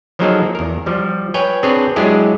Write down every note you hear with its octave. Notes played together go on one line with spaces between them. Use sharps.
F3 F#3 A#3 D#4 G#4 A4
E2 A#4
F3 G3
B4 C#5 G5 G#5
C4 D4 G#4 B4 C#5
F#3 G#3 D4 E4 G4 G#4